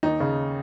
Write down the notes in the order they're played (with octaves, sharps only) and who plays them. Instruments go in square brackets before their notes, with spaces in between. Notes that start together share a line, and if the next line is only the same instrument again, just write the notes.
[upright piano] D#2 D#4
C#3